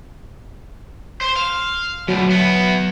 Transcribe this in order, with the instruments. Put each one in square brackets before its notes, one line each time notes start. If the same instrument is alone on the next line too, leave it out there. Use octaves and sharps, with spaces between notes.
[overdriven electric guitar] C5
F5
[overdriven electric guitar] D2 B2 [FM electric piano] F#3
[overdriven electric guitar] E3 B3